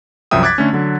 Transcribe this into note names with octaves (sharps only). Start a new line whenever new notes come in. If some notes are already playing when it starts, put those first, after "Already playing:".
C2 F#2 F3 E5 G5 D#6
D6 F#6 G#6 A6 B6
D3 A3 C#4
D3 F#3